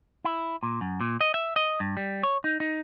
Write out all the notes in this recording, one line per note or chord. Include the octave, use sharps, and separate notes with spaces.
E4
A#2
F#2
A#2
D#5
E5
D#5
G2
G3
C#5
D#4
D#4